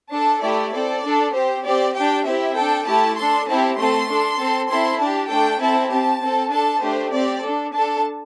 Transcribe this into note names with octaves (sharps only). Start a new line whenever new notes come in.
D4 A4 A5
A3 E4 G4 D5
C4 A4 D5
D4 A4
C4 G4 C5
C4 G4 D5
D4 G4 G5
C4 E4 G4 E5
D4 A4 G5
A3 E4 G4 A5
D4 A4 C6
C4 E4 G4 A5
A3 C4 A4 C6
D4 A4
C4 A4
C4 E4 A4 C6
D4 G4 A5
A3 D4 A4 G5
C4 E4 A4 A5
C4 G4 A5
C4 A4
D4 A4 A5
A3 D4 G4 C5
C4 G4 D5
D4 A4
D4 A4 A5